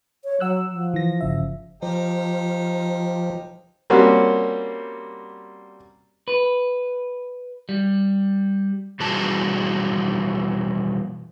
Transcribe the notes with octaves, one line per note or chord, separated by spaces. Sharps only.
C#5
F#3 F#5 E6 F#6
F3
E3 A#6
G1 C#3 E5
F3 D#4 G4
G3 A#3 C4 C#4 F#4
B4
G3
B2 E3 G3 F#4 G#4 A5